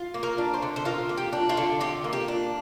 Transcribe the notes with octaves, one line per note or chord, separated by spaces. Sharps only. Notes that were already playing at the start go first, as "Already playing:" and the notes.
Already playing: F4
A#3
A#4
D4
C5
D3
C5
F4 A#4
A#3
G4
D4
F4
D3
F4 G4
A#3
G4
D4